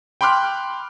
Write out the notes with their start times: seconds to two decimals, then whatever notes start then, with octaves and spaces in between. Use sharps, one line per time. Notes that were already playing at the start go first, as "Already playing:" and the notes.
0.21 G5 B5 C6 D6 F6 F#6